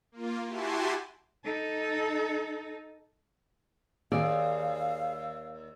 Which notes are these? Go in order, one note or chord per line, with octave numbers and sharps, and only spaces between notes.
A#3 F4
E4 F#4 G4 G#5 A5 C6
D#4 A4
D#2 G#4 D5 F5